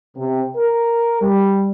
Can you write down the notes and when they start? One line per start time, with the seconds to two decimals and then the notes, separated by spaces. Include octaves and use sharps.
0.16 C3
0.56 A#4
1.22 G3